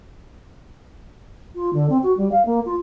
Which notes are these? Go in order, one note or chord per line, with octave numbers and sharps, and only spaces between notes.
F4
D3
C4
F#4
G3
F5
A#3
F4